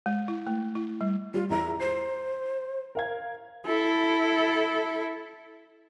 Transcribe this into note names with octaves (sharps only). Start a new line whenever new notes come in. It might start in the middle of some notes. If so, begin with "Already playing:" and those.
G#3
E4
A3
E4
G3
G3 F4
E2 E4 A#5
C5 C7
A#4 F5 G#6
E4 A4